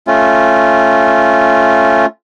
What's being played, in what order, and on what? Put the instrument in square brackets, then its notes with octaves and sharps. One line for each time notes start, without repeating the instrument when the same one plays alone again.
[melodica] A3 C#4 F4